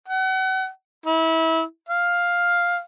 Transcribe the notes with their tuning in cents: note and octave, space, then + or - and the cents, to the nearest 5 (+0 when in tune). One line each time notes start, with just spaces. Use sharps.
F#5 +35
E4 -25
F5 +5